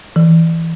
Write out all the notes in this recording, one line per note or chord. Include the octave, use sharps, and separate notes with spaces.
E3